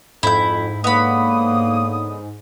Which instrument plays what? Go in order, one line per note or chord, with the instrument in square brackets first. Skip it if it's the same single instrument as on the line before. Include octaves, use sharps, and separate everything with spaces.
[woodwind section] F2 [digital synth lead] G#2 [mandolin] E4 G6
[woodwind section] D3 C#5 D#6 [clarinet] A#3 [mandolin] B3 B5